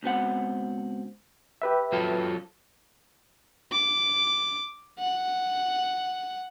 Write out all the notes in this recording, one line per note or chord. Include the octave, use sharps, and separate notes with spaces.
C#2 B2 C4 F#5
G4 B4 E5
F#3 F4 A4
D6
F#5